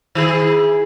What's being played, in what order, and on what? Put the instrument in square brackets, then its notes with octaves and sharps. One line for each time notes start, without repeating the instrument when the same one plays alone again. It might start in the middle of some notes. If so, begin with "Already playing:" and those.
[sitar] D#3 E4 G#4